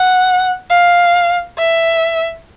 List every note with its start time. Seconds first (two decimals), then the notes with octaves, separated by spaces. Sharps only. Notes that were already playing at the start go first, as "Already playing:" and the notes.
Already playing: F#5
0.70 F5
1.59 E5